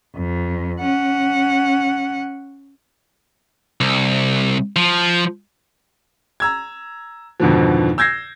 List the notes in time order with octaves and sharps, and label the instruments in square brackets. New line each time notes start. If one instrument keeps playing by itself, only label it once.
[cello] F2
C#4 F#5
[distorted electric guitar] C2
F3
[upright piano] A#5 E6 G#6
F2 G#2 B2 D3 D#3 F3
E6 G6 G#6 A#6 C7